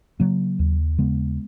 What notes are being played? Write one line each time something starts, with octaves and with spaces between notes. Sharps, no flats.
C#3 F#3 A#3
D#2
C#3 G#3 B3